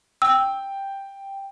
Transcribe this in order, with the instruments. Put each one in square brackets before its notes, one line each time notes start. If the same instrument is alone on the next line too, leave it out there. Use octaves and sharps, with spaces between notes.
[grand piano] G5 [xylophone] E6